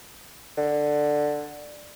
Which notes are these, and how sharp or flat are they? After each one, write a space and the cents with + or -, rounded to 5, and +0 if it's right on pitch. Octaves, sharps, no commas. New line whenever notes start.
D3 +10